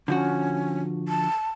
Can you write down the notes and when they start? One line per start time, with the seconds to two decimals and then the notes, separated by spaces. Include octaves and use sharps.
0.08 D3 F3 C#4 F#4
1.08 A5